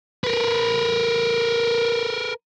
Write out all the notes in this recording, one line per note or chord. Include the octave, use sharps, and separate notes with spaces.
A#4 B4